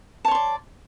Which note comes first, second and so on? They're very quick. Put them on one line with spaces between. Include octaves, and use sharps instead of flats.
A5 C#5 C6 D5